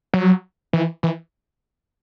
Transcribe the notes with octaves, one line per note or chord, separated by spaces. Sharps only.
F#3
E3
E3